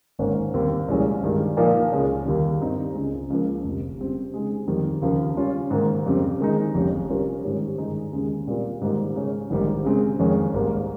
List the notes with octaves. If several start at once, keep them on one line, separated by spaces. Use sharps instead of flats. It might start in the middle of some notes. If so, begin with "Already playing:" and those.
G#1 G#2 D#3 A#3 C#4
D#2 D#3 G3 C4
C2 A#2 F3 G#3 C#4
G2 D#3 G#3
A#2 F3 A#3 D#4 A#4
C#2 C#3 G#3 C#4
D#2 D#3 G3
G2 G3 C4 D#4
C#2 C#3 G#3
C#2 C#3 F3 A#3
F1 F2 C3
C#3 G3 C4
C#3 G#3 D#4 G#4
F2 D#3 G3 C4 D#4
D#2 C#3 F3 A#3
C#3 G3 C#4 F4
G#2 D#3 A#3
F2 C#3 G3 C4
D#3 G#3 D#4
F1 F2 C3 G3 C#4
C3 G3 C#4 F4 A#4
G#2 D#3 G3 C#4 G4
G2 D#3 G#3 D#4 G#4
D#2 C#3 G#3
A#2 G3 C4 F4 A#4
G#2 D#3 G3 A#3 D#4
C#3 G#3 C#4
A#1 G#2 D#3 G3
C#3 G#3 C4
F2 D#3 G#3 C#4
G#1 G#2 G3 A#3